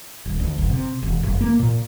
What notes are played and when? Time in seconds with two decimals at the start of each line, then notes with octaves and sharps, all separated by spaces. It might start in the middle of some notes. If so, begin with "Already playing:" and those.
0.25 D#1
0.40 D2
0.58 F#1
0.70 C3
1.02 E1
1.23 F#1
1.41 A#3
1.59 A#2